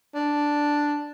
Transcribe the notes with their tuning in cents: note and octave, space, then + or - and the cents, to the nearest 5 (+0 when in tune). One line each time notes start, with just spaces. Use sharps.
D4 +0